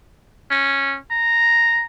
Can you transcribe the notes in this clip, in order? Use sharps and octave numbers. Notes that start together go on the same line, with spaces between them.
C#4
A#5